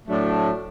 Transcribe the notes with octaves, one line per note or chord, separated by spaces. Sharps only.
A2 F#3 A3 D4